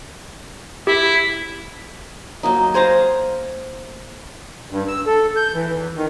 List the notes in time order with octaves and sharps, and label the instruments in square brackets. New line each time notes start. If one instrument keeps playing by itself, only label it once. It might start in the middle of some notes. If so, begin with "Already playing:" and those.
[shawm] E4 [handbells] G4
[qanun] F#3 A#3 D#4
G#4 C5 F5 A#5
[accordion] G2
E6
A4
G6
E3
E2
D#3